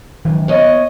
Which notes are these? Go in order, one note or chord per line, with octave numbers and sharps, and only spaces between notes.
D#3 F#3
B3 C#5 D#5